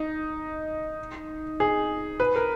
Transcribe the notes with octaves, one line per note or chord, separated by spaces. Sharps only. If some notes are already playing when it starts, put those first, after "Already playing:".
Already playing: D#4
G#4
B4
A#4